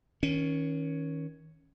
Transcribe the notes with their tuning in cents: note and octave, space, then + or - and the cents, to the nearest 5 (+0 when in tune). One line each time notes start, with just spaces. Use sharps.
D#3 +30 C#4 +0